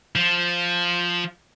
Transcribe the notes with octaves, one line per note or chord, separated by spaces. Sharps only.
F3